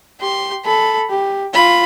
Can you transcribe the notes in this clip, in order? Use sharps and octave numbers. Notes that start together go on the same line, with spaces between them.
G4 C6
A4 B5
G4
F4 B5